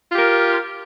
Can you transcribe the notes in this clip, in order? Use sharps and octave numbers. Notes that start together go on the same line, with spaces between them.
F4 G4 A#4